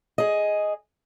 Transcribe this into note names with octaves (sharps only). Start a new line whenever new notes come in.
G#4 D#5